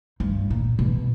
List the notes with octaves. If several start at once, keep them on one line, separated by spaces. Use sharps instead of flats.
G2
A#2
B2